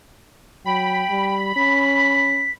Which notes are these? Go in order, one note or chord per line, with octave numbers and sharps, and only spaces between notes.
F#3 G5 B5
G3
C#4 B6